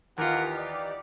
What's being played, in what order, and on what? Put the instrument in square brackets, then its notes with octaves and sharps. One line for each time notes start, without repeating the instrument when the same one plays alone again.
[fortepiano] D#2 F4 [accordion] E3 D#4 G4 [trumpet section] A#4 F#5
[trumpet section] D5